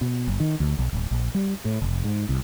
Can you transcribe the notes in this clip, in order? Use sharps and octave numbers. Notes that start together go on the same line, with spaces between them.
B2
F#1
D#3
D2
B1
D1
A#1
G3
A2
F1
G#2
C2